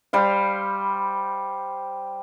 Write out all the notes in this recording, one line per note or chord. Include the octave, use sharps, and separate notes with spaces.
G3 C5 F5